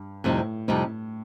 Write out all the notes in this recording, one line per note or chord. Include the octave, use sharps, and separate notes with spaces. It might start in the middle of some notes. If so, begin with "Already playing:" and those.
Already playing: G2
F2 A2 C3 G3 C4 D#4
F2 C3 G3 C4 D#4